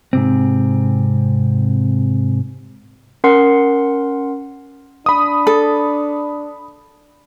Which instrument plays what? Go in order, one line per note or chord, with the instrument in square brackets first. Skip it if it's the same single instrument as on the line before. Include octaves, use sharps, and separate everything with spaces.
[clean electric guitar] G#2 C3 C4
[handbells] C#4 A#4 F#5 C6 C7
[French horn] D4 [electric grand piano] B5 D#6
[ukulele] A4